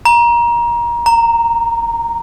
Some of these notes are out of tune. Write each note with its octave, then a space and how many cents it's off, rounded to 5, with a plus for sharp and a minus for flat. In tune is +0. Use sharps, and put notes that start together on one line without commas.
A#5 +25
A#5 -10